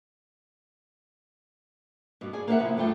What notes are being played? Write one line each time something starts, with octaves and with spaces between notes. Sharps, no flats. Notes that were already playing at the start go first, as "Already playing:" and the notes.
G2 B2
G#4 D5 G#5
A#3 D4 B4 D5 E5 F#5
C3 F3 B3 E4
G2 A3 F4 G5